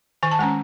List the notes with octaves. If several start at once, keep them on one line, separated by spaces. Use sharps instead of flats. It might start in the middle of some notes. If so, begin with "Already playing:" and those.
D#3 G#5
A5
G#3 C#4 G#5